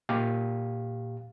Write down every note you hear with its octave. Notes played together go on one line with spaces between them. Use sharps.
A#2 G4 F5